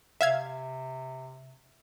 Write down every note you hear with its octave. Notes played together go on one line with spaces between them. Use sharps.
C3 E5 F5 G#6